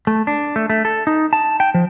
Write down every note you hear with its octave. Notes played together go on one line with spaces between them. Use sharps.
A3
D4
A3
A3
A4
D#4
A5
G5
F3